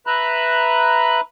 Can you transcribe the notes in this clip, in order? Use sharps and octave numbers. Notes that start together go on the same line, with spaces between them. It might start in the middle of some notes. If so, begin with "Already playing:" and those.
B4 E5 A#5 B5 F#6